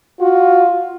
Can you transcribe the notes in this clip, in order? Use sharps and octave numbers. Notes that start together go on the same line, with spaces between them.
F4 F#4